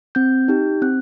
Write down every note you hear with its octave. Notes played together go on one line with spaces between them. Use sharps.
C4 G6
D#4 G4
C4 F#6